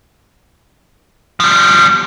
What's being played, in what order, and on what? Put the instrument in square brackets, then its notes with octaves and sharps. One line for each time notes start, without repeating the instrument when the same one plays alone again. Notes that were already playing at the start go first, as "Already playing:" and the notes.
[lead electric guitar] F3 G3